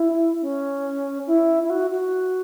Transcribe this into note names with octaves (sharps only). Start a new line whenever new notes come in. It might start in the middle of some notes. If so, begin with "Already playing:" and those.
Already playing: E4
C#4
E4
E4
F#4
F#4